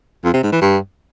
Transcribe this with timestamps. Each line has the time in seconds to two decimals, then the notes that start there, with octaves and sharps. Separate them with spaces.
0.24 F2
0.34 C3
0.43 G#2
0.52 E3
0.62 G2